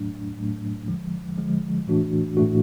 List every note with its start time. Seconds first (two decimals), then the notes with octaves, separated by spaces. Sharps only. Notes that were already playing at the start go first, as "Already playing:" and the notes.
Already playing: A2 F#3 A3 D4
0.37 A2 F#3 A3 D4
0.88 D3 F3 G#3
1.38 D3 F3 G#3
1.87 A2 E3 A3 D4 F#4
2.37 A2 E3 A3 D4 F#4